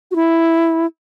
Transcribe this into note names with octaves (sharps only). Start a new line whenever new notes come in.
F#4
E4